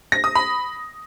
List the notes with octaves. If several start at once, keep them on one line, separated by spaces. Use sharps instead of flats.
A#6
D#6
B5